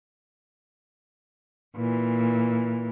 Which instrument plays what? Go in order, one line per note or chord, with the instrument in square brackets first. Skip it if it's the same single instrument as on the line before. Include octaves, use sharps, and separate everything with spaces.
[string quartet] A#2 E3